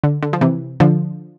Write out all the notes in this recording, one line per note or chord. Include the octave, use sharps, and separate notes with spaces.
D3
D3
F3
C3 E3
D3 F3